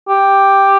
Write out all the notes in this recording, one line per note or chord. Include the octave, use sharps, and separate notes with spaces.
G4